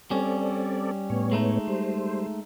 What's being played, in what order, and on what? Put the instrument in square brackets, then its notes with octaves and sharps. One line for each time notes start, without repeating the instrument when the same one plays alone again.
[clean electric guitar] G3 C#4 [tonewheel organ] C4 A4 D5
[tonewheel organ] A2 B3 C#5
[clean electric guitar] G#3 A3 D#4
[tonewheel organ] G3 C5